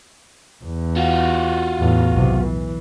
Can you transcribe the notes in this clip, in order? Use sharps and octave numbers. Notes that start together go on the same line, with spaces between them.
E2
F4 F#4
E2 A2
B1 C3
E3